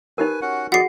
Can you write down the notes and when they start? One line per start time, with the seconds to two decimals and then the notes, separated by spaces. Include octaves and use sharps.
0.18 D#4 G4 A#4 B4 G#5
0.42 C#4 F#4 F#5
0.72 F#4 G#4 D5 D#5 F#5 C7